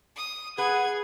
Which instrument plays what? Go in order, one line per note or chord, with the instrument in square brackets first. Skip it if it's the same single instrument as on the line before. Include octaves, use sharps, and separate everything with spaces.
[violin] D#6
[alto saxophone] G#4 [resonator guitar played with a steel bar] B4 [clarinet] F#5 [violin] G#6